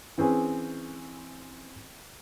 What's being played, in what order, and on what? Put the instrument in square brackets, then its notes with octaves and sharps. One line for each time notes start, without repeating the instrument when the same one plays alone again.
[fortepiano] E3 C4 C#4 G#4 B4